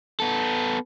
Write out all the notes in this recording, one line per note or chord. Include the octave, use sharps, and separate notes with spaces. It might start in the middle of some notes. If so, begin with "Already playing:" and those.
B3 A4